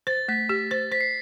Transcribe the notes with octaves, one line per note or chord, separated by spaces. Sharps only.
C5 A6
A3 B6
G4 B6
C5 A6
C5 B6
C7